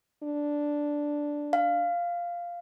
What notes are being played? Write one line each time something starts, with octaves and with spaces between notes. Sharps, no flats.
D4
F5